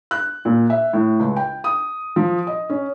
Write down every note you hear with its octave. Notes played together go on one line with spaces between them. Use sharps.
F#6
A#2
E5
A2
C#2
G5
D#6
F3
D#5
C#4